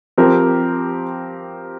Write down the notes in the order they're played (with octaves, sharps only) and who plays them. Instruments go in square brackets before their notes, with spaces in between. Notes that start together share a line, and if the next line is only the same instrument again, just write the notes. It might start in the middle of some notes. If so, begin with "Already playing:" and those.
[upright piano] F3 C4 G4 A#4